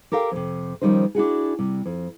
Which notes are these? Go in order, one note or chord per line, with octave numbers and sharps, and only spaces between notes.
G4 A4 A#4 F5 G5
F2 C3
D#3 F3 G3 C#4 D#4 C5
D4 E4 F#4 G#4
C3 G3
F2